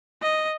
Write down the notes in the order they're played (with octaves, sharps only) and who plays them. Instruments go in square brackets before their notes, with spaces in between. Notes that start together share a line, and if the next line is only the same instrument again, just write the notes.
[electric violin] D#5